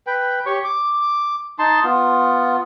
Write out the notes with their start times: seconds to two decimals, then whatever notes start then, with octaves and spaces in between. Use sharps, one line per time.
0.07 B4 G5
0.46 G4 C#5 C#6
0.64 D6
1.59 D#4 A5 C6
1.84 B3 F4